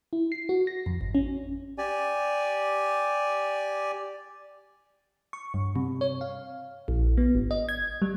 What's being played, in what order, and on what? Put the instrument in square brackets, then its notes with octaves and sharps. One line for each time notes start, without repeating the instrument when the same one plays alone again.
[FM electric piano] E4
C7
F#4
A#6
F2
G#1
C#4
[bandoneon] G4 D5 G#5
[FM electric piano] C#6
G2
C3
C#5
F5
A#1
B3
G#1
D#5
G#6
G3